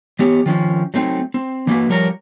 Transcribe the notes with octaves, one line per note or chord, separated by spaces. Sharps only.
E3 B3 G4 C#5
D#3 F3 C#4
F#3 A3 C4 D#4
C4
E3 A#3 F#4 B4
F3 G3 A#4 C#5 A#5